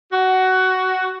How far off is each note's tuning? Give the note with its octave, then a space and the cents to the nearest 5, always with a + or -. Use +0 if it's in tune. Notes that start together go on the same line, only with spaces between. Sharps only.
F#4 +15